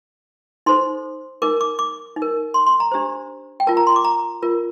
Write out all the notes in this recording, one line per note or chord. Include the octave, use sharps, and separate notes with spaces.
D#4 A4 C5 C6
D#4 A#4 D6
D6
D6
D#4
A#4
C6
C6
A#5
D4 G4 C5
G5
F4 A#4 A5
A#5
C6
D6
A#5
F4 A#4